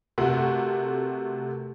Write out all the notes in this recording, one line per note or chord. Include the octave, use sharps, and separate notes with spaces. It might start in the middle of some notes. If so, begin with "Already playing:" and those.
C3 A3 F#4 A#4